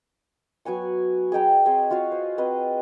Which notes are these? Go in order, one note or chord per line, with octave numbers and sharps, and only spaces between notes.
F#3 B3 G#5 C#6
G#4 D#5 G5 A#5
C4 G#4 C#5 D#5
F4 F#4 C#5 F5
C5
C4 B4 D#5 G#5